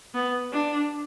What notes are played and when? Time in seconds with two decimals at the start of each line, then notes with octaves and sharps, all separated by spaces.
0.15 B3
0.53 D4